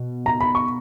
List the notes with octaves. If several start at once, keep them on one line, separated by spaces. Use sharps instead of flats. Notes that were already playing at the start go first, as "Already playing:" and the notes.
Already playing: B2
A#5
B5
C#6